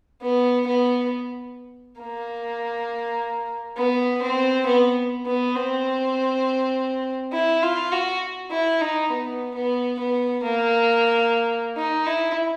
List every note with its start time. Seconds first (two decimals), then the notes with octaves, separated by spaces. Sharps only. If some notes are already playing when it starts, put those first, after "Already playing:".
0.22 B3
0.67 B3
2.00 A#3
3.77 B3
4.22 C4
4.66 B3
5.26 B3
5.55 C4
7.33 E4
7.62 F4
7.92 F#4
8.51 E4
8.81 D#4
9.10 B3
9.55 B3
9.99 B3
10.43 A#3
11.77 D#4
12.06 E4